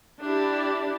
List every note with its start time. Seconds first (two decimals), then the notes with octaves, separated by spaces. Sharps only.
0.22 D4 E4 G4